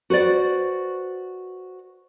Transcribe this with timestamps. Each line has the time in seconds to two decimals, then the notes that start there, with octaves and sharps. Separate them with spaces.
0.10 F#4 B4 C5 D5